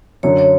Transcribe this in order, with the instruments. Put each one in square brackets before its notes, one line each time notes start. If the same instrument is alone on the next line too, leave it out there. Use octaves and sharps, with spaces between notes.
[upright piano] F#2 D3 F#3 [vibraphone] C#5
[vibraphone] C#5